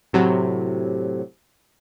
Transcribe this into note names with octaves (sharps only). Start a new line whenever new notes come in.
A2 C3 F#3